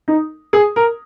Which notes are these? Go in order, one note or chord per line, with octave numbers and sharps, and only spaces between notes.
D#4
G#4
A#4